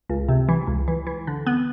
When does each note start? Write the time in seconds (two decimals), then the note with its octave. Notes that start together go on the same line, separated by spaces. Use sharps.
0.10 C#2
0.29 C3
0.49 E3
0.67 C#2
0.88 E3
1.07 E3
1.27 D3
1.47 B3